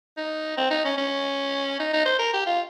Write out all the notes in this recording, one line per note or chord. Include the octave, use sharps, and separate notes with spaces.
D#4
C4
D#4
C#4
C#4
D#4
D#4
C5
A#4
G4
F4